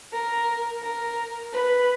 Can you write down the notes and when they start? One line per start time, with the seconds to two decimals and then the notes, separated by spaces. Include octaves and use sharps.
0.13 A#4
0.82 A#4
1.53 B4